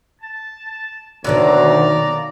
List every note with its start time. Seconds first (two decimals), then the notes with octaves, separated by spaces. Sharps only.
0.21 A5
1.24 D2 B2 D3 D#3 F#3 A#3 D5 A#5